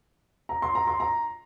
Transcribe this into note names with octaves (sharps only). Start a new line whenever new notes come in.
A#5
C6
A#5
C6
A#5